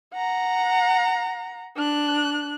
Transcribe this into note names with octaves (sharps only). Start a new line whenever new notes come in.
F#5 A#5
D4 F#6